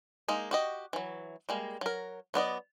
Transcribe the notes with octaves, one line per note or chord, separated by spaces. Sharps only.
G#3 A#3 D#4
F#4 G4 D#5
E3 F#3
G3 G#3 A#3
F#3 A#4
F#3 B3 D5 D#5